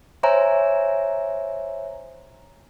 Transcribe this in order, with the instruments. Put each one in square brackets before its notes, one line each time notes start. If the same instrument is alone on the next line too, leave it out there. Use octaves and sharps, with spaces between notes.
[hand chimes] C5 C#5 E5 G#5 A#5